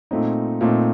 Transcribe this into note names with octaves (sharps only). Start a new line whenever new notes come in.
A#2 A3 C4 D#4
A#2 A3 C4 D#4